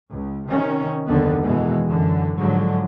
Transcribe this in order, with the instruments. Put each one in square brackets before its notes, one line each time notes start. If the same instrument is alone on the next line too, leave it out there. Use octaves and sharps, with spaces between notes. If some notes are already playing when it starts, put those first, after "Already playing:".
[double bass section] C#2
C3 D#3 C#4
F#1 D#2 D3 D#3 B3
E2 B2 D#3 E3 G#3
F#2 D3 E3
G#2 D3 F3 F#3